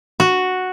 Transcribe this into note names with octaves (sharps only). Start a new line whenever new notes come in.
F#4